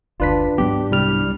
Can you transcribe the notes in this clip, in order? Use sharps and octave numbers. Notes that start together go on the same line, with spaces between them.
F#1 D2 D4 F4 B4 B6
G#2 F#3 B3 G4
C2 G3 F6